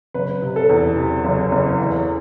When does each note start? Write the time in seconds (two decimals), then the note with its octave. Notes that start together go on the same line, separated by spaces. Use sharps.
0.14 F#1 B4
0.42 C3
0.56 A4
0.69 E2
0.97 C3
1.24 F#1
1.51 F#1
1.78 E2